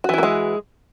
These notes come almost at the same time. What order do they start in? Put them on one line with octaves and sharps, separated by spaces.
F#4 E3 E4 A#3 G#3